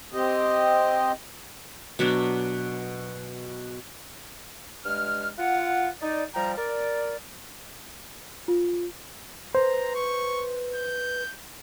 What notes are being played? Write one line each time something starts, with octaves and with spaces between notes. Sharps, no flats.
C4 G4 D#5
B2 F#3 B3 D4
G2 G#3 F6
F4 F#5
D#4 D5
F3 G3 G5 A#5
A#4 D5
F4
B4 C5 A#5
C#6
G6